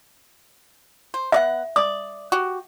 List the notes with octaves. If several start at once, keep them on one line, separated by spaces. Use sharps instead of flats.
C5
B3 D5 E5 F#5
D5 D#6
F#4 G4